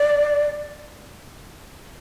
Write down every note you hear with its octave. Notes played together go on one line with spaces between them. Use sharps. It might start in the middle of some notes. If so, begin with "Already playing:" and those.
Already playing: D5